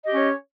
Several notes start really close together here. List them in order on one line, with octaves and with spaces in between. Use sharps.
D#5 G4 C#4 C#5